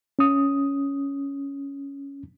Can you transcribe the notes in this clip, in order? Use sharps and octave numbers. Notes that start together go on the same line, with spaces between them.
C#4 D#6